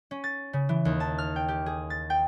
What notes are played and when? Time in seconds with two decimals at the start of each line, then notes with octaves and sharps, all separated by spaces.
0.11 C#4
0.24 A6
0.53 C#3
0.69 E3
0.85 D#2
1.00 A5
1.18 F6
1.36 G5
1.48 G4
1.66 G#4
1.90 A6
2.10 G5